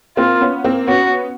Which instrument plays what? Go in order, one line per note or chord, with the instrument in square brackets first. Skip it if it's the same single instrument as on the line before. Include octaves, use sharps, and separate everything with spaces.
[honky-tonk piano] A#3 C4 [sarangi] F4
[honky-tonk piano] B3 C#4
A#3 C4
[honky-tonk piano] B3 C#4 [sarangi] F#4